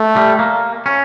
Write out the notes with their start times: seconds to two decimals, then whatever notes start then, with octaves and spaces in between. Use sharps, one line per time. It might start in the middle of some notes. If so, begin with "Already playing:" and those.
Already playing: A3
0.16 G3
0.39 A#3
0.86 C#4